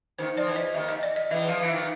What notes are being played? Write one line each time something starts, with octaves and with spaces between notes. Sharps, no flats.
D#2 D#3 C5
F3 D5
E2 E3
D#5
D#2 D#3 E5
D#5
D5
D#5
E2 E3 E5
F3 F5
E3
E5
D#3